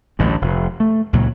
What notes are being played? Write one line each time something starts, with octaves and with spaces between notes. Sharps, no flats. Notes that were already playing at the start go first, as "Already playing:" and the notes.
A1 D2 G2
F1
A3
C#2 A#2 F#3